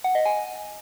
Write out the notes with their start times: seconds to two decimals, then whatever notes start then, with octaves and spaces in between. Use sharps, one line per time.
0.04 F#5
0.15 D#5
0.25 G#5